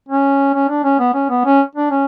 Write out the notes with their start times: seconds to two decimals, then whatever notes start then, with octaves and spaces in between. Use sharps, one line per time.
0.09 C#4
0.54 C#4
0.68 D4
0.84 C#4
0.99 B3
1.14 C#4
1.30 B3
1.45 C#4
1.75 D4
1.91 C#4